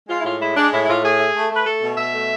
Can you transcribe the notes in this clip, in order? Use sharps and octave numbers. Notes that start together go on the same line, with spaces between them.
G#3 F4
E4
A2 F4
G#3 E4
G#3 D4
A2 E4
E4
A2 F4
A3 G#4
A3
A3
A3 B4
A3 A4
B2
B2 E5
A3